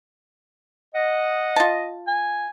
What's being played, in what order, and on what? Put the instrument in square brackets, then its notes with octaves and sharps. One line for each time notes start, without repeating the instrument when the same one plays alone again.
[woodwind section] D#5 [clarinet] F#5
[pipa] F4 A5
[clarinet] G#5